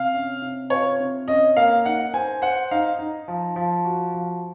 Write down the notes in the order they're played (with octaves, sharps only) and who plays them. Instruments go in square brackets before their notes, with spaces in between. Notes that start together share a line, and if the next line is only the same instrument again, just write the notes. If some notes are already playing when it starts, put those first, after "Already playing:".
Already playing: [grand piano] C3 [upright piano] F5
[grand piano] C#4
C3
[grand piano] F4 [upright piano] C#5
[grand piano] C3
[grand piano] C#4 [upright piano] D#5
[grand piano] A#3 [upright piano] F5
[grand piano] D#4 [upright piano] F#5
[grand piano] C5 [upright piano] G#5
[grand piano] C5 [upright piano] F#5
[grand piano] D#4 [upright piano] F5
[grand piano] D#4
F3
F3
F#4
F3